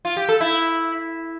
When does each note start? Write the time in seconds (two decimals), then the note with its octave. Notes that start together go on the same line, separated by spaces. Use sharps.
0.05 F4
0.17 G4
0.29 A4
0.41 E4